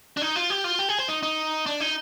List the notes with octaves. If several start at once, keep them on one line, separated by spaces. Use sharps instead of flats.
D4
D#4
F4
G4
F4
G4
G#4
C5
D#4
D#4
D4
D#4